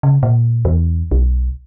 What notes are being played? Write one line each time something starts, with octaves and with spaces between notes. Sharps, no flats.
C#3
A#2
E2
B1